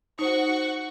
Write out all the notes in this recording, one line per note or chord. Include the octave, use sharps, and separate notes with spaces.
D#4 F#4 C5 F#5 C#6